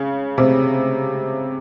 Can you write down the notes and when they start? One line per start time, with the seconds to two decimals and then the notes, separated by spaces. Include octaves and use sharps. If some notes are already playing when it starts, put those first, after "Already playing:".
Already playing: C#3
0.38 C3